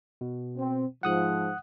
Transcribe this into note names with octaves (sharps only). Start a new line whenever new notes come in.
B2
C4
G#2 F3 F#5 D#6 F#6